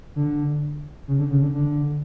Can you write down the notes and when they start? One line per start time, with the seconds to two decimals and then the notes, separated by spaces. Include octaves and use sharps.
0.16 D3
1.08 C#3
1.19 D3
1.30 C#3
1.42 D3
1.54 D3